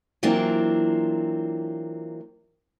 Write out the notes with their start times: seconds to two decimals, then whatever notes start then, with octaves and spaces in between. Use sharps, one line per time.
0.23 E3 F#3 A#3 C4 D4 F4